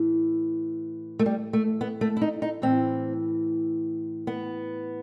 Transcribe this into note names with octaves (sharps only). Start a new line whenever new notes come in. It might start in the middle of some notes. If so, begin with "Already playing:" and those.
Already playing: A2 E3
A3
G3
A3
B3
A3
E4
D#4
D#4
A2 E3 C4
B3